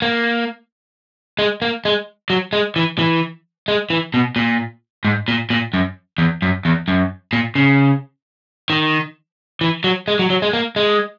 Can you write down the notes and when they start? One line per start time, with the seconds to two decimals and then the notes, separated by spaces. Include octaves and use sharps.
0.02 A#3
1.39 G#3
1.62 A#3
1.85 G#3
2.30 F#3
2.53 G#3
2.76 E3
2.99 E3
3.68 G#3
3.90 E3
4.14 B2
4.36 A#2
5.05 G#2
5.28 A#2
5.50 A#2
5.74 F#2
6.18 E2
6.42 F#2
6.65 E2
6.88 F#2
7.33 A#2
7.55 C#3
8.70 D#3
9.61 E3
9.84 F#3
10.08 G#3
10.19 F#3
10.30 F#3
10.42 G#3
10.53 A#3
10.76 G#3